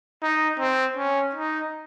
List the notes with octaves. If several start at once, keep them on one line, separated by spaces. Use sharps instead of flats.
D#4
C4
C#4
D#4